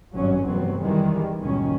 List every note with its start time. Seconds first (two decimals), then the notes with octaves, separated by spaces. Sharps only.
0.15 G#1 G2 B2 F#3 C#4
0.46 F1 E2 G2 F#3 B3 C4
0.82 D#3 E3 G3 G#3
1.40 G1 C#2 A#2 D#3 F#3 C#4